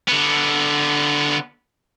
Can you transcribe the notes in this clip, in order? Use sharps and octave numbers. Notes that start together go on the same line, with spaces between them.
D3 B3